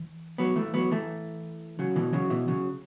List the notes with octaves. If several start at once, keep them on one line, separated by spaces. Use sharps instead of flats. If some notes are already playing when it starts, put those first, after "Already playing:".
Already playing: E3
F#3 B3
E3 A3
F#3 B3
E3 A3
C#3 F#3
B2 E3
C#3 F#3
B2 E3
C#3 F#3